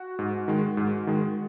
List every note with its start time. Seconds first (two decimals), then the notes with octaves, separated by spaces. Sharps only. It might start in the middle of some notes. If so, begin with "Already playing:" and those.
Already playing: F#4
0.19 G#2
0.48 D#3 G#3
0.77 G#2
1.07 D#3 G#3